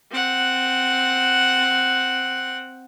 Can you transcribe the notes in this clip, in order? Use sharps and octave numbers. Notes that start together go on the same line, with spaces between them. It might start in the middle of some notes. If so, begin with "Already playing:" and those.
C4 F#5